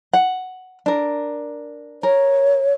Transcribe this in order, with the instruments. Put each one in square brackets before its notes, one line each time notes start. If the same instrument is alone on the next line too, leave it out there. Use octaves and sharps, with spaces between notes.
[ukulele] F#5
D4 A#4
[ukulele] A#4 [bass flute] C#5